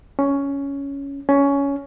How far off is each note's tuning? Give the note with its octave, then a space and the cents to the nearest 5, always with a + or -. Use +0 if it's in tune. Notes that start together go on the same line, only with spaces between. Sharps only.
C#4 +10
C#4 +15